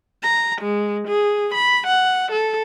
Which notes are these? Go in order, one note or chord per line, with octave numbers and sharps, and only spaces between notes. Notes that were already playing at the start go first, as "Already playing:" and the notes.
A#5
G#3
G#4
B5
F#5
A4